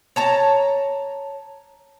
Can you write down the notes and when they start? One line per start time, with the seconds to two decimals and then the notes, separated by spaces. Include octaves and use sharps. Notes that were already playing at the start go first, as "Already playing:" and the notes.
0.16 C#5 A5 A#5